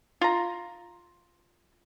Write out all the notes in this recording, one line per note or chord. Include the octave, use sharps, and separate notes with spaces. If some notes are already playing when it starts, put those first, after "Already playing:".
F4 A#5